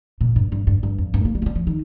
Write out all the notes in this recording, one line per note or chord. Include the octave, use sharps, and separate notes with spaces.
A#2
G2
G2
G2
G2
F2
G2
A#3
G3
A#3
G3
F3
D#3